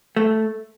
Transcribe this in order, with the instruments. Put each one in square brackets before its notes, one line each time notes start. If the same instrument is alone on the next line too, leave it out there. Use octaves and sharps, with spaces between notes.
[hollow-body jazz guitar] A3